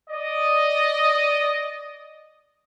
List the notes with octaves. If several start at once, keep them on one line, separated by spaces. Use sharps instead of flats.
D5 D#5